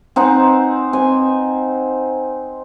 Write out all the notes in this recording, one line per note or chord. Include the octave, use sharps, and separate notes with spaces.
C4 D#4 F#5 G#5
C4 G#5